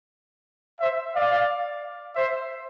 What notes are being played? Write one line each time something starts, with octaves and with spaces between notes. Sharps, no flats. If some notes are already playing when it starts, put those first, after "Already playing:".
C5 E5
D5 F5
C5 E5